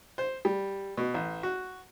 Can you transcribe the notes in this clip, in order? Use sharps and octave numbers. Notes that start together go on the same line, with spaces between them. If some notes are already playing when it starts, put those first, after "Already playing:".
C5
G3
B2
A1
F#4